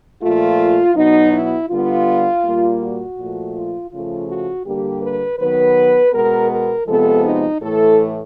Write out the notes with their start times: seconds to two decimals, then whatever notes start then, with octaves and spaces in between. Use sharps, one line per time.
0.22 A#2 F3 A3 F4
0.95 B2 F#3 B3 D#4
1.32 E4
1.69 D3 G3 B3 F4
2.43 A#2 G3 A#3
2.80 F#4
3.17 A#2 F3 A3
3.54 F4
3.91 C#3 F3 A3 F4
4.29 F#4
4.65 D3 G3 A#3 G4
5.02 B4
5.39 D#3 F#3 B3 B4
6.13 B2 G#3 B3 A#4
6.50 A#4
6.87 C3 F3 G#3 B3 A4
7.24 D#4
7.61 A2 E3 A3 A4